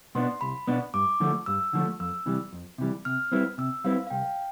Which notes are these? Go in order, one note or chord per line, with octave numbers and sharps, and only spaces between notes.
B2 B3 D4 C6
C2 B5
B2 B3 D4
G2 D6
D3 F3 A3
G2 E6
D3 F3 A3
F2 E6
C3 E3 G3
F2
C3 E3 G3
C3 F6
G3 C4 E4 B4
C3 E6
G3 C4 E4 B4 F5
F5
C2 G5